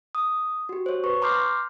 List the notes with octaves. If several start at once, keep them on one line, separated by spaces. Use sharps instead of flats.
D#6
F#4 G4
C5 C#5
B4 C#6
A#5 C6 D6 F6 G6 C7